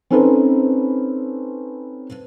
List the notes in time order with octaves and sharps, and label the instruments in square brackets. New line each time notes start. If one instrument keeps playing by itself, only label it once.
[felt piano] C4 C#4 D#4 A4 B4 C5